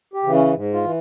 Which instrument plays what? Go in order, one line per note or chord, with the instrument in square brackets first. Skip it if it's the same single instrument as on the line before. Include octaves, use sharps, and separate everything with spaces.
[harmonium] G4
C#3 E3
C#4
G#2
F4
E3